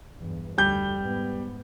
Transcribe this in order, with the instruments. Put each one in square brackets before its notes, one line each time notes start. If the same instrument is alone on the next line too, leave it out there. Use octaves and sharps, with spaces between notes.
[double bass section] B1 E2 G2
[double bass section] F1 D2 [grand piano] G3 G6
[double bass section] G#2 B3